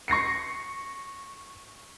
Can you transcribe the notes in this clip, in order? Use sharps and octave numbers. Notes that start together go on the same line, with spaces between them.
C#6 A#6 C7 C#7